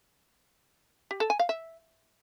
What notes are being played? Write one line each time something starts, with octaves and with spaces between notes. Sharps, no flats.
G4
A4
G#5
F5
E5